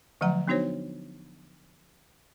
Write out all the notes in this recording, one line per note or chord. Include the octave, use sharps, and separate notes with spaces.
D3 F3 F#3 A3 F#5 A#5
B3 D4 D#4 F#4 C5 C#5